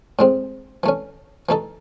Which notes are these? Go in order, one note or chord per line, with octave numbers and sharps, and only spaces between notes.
A2 G#3 C4
E3 A3 C#4
E3 A3 D#4 A4